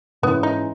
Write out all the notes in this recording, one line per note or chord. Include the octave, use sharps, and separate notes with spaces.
G#2 E3 G#3 B3 C#4 E4
D#4